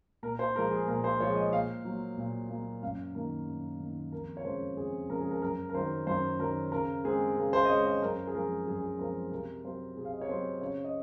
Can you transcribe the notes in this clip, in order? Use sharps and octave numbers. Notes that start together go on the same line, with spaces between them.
A#2 A#4
C5
F3 G#3 A#4
G#4
A#2 A#4
C5
F3 G#3 C#5
D#5
A#2 F5
F#3 A#3
A#2
F#3 A#3
F#2 F5
D#3 A#3 A#4
F#2
D#3 A#3
F2 A#4
C#5
C#3 F3 G#3 C5
F2 G#4
C#3 F3 G#3 A#4
G#4
A#4
F#2 A#4
A#4
D#3 F#3 C5
F#2 C5
D#3 F#3 A#4
C#3 A#4
G#3 C4 G#4
C#3 A#4
C5
D#5
G#3 C4 C#5
D#5
F#2 A#4
G#4
F3 G#3 C4 A#4
F#2 G#4
G#4
F3 G#3 C4 A#4
C3 A#4
F#3 C4 C5
C3 G#4
F5
D#5
C#5
F#3 C4 C5
C#3 C#5
D#5